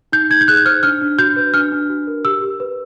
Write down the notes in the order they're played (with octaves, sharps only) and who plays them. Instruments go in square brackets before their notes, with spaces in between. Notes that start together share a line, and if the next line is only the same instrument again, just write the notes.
[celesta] D#4 G6
D#4 G#6
G6
G#4 F#6
C5 F6
D4 F6
D4
F#4 G6
B4
D4 F6
D4
F#4
A#4
G4 E6
G4
B4